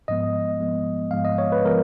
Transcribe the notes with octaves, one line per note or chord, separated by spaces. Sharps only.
G#2 F3 G#3 B3 D#5
G#2 F3 G#3 B3
G#2 F3 G#3 B3 F5
D#5
C#5
B4
F3 G#3 B3 A#4